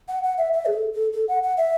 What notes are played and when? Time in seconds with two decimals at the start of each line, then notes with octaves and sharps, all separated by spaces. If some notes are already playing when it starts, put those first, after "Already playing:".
0.08 F#5
0.23 F#5
0.38 E5
0.53 E5
0.66 G#4
0.73 A4
0.93 A4
1.13 A4
1.28 F#5
1.43 F#5
1.57 E5